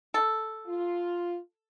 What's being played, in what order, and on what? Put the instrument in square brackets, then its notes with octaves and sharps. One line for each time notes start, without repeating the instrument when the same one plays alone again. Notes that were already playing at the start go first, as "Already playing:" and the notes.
[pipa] A4
[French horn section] F4